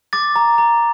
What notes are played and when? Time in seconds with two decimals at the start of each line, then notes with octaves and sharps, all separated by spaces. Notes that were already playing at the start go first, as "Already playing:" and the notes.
0.13 D6 A6
0.36 A#5
0.58 A#5